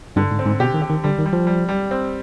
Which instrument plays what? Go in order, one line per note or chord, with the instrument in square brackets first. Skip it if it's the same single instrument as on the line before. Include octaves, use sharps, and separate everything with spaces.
[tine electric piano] G2 [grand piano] D3
[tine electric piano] G#2
[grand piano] C4
[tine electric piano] G#2
[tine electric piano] B2 [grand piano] G4
[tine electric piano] D#3
[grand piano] G4
[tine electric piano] D#3
[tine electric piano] D3 [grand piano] G3
[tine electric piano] D#3
[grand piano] G3
[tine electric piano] F3
[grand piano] G3
G3
C4